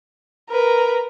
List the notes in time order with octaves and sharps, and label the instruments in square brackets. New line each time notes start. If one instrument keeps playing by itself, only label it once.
[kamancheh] A#4 B4